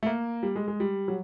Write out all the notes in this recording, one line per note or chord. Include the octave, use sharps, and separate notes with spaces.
A3
A#3
G3
G#3
G#3
G3
F#3